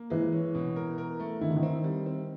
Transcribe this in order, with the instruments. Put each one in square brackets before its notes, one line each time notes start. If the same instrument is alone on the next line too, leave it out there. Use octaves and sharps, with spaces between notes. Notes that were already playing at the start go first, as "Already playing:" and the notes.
Already playing: [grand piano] A#3
[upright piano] E3 [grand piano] G#3
[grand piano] C#4
B2
A#4
A#4
A3
[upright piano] D#3 [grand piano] E4
[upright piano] D3
D#3
[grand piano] C4
G3
C4